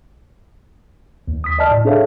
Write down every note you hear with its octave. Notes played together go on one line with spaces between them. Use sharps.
D#2
D#6 B6
D5 D#5 A5 F6
A2
D4 G#4 A4 C#5 E5 F5